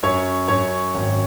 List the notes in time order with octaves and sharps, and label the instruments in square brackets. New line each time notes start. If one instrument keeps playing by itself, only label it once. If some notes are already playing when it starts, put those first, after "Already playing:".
[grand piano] F#2 [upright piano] C#5
[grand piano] F#2 [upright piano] C#5
[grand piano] G#1